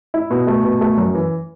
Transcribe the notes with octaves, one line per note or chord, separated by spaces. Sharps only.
E4
B2
A3
B2
A3
F#2
E3